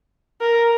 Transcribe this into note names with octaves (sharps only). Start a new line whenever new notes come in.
A#4